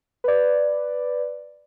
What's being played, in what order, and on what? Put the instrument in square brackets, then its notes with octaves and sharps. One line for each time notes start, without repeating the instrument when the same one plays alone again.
[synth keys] B4 D5